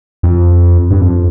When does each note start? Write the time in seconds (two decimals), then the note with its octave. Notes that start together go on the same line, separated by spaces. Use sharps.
0.23 F2
0.91 G2
1.01 F2